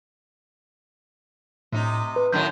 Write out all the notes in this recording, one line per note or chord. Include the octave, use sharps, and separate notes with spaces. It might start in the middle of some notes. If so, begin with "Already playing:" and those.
A2 C3 D#4
B4
F#2 A2 D#3 G6